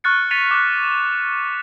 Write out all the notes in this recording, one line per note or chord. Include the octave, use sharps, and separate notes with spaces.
C#6 F6 F#6 A6 C#7
A6 B6 C#7 D#7 F7
D6 F#6
E7